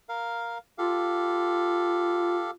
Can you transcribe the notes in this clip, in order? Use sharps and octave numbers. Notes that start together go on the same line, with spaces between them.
A#4 F5
F4 G4 A4 F5